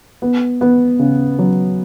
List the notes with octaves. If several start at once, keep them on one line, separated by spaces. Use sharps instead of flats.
B3
B3
C#3
F#3